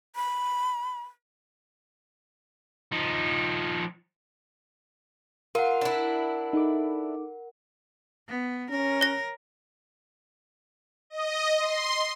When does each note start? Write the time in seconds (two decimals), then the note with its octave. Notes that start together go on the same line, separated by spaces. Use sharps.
0.16 B5
2.92 F3 D#4
5.55 F4 A#4 F#5
5.81 D4 E4
6.53 D#4 A4 D6
8.28 B3
8.70 C#4 A#4
9.01 C#5 A#6
11.10 D#5
11.59 C6